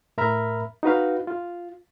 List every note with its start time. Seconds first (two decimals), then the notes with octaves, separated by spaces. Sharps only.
0.18 A2 A#4 E5 A#5 B5 F6
0.83 D#4 F#4 B4 F5
1.27 F4